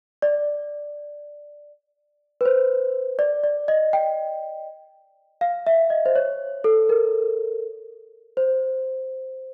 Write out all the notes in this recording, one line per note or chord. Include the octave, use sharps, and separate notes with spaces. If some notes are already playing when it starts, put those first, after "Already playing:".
D5
B4
C5
D5
D5
D#5
G5
F5
E5
D#5
C5
C#5
A4
A#4
C5